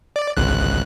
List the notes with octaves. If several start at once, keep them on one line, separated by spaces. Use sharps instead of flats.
D5
G#1 C#2 F#6